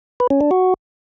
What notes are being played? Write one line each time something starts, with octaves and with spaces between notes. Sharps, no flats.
B4
C#4
D4
F#4